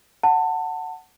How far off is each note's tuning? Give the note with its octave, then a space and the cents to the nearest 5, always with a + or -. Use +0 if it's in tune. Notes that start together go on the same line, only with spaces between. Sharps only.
F#5 +0 A5 +20